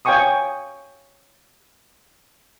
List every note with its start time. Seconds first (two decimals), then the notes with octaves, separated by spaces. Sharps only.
0.05 C#5 F5 G5 G#5 C#6 D#6